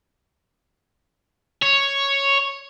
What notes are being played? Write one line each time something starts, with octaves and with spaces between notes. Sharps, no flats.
C#5